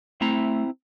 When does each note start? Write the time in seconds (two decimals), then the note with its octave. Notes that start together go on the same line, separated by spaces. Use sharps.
0.21 A3 C4 E4 A#5